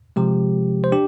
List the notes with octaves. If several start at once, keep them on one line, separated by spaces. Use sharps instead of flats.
C3 F3 G#3 G4
C5
D4 G4